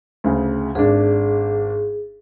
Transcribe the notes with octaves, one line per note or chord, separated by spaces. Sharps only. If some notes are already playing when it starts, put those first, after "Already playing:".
D2 C#3
G#1 D4 G#4